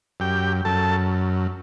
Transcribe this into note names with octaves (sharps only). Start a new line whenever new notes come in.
F#2 G4 G5
F#2 A4 A5